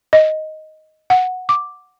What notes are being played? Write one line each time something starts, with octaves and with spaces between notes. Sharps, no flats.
D#5
F#5
D6